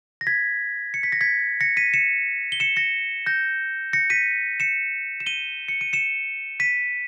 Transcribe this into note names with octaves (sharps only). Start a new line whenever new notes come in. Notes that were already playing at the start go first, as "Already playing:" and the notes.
A#6
G#6 B6
C#7
B6
A#6
G#6 B6
A#6 C#7
B6 D#7
C#7 E7
G7
C#7 E7
A#6 C#7
G6 A#6
A#6 C#7
B6 D#7
C#7 E7
E7
D#7 G7
C#7
D#7
C#7 E7
B6 D#7